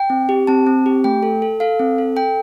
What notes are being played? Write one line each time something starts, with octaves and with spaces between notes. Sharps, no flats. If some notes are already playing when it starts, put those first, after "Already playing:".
Already playing: G5
C4
G4
C4 A5
C4
G4
A3 G5
A4
A4
A4 F5
C4
A4
A4 G5